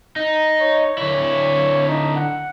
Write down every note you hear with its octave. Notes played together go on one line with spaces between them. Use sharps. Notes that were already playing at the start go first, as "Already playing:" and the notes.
D#4
C#5
D3 E4 C#5
D#4
F#5